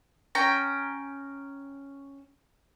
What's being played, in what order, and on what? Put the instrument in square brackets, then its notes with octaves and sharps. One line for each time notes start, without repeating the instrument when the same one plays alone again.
[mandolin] C#4 G5 A#5